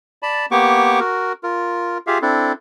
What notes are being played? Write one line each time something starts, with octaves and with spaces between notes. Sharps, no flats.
D5 A5 B5
A#3 B3 G4 C#6 D6
F#4 A#4
F4 A#4
F4 G4 G#4 E5 F5
C4 D4 E4 A4